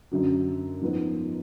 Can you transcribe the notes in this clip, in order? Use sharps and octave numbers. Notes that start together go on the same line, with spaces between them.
F#2 D3 F#3
G#2 F3 B3